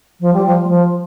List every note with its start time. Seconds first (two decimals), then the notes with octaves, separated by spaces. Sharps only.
0.20 F3
0.34 G3
0.46 F3
0.64 G3
0.68 F3